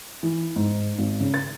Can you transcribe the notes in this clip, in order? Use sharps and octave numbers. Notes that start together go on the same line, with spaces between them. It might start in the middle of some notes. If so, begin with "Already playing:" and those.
E3
G#2
G#1
C#3
A6